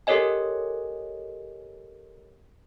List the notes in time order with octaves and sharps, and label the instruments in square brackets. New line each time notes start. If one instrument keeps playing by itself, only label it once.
[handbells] G4 A4 A#4 C#5 D#5 G#5